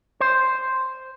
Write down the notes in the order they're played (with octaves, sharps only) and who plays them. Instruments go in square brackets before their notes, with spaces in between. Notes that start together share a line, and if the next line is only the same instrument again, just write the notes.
[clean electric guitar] C5